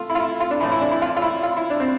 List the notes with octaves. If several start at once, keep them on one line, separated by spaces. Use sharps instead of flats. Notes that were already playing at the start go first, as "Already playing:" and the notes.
Already playing: A3 F4
E4
F4
E4
F4
D4
A2 E3 E4
E4
D4
E4
F4
F4
E4
F4
E4
D4
C4